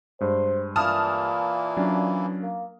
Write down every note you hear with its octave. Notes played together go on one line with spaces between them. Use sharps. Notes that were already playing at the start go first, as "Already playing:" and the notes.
G2 G#3 C5
A#2 E3 A#3 E4 A5 D#6 F6
F#3 C#4 D4
A#3